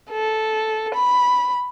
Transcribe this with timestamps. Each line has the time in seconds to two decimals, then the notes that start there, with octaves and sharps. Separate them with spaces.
0.10 A4
0.94 B5